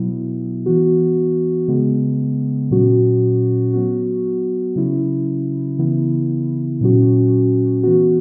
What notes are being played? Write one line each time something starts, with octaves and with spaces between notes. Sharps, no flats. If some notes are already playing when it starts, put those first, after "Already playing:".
Already playing: B2 F#3 B3 E4
E3 B3 F#4
C#3 G#3 B3
A#2 F#3 C#4 F#4
F#3 B3 F#4
C#3 F#3 C#4 E4
C#3 E3 B3 E4
A#2 F#3 C#4 F#4
E3 B3 F#4